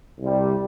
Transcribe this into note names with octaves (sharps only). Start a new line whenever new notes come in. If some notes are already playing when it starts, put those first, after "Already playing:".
C2 C3 G3